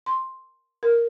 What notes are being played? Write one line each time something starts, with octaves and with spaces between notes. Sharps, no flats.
C6
A#4